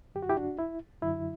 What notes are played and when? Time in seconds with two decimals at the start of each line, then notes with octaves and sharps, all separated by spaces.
0.15 F#2 D3 F#3 G4
0.23 F#4
0.29 E4 G4
0.37 D4 F#4
0.59 E4
1.02 F#2 D3 F#3 E4